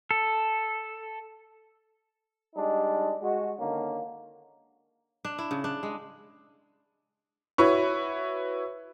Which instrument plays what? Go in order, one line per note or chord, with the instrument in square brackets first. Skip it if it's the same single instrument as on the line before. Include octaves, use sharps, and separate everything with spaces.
[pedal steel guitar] A4
[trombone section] G3 G#3 D4 D#4
G#3 F#4
D3 D#3 A#3 C#4
[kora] D4
E4
C#3
D4
G#3
[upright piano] E4 F#4 B4 C#5 C#6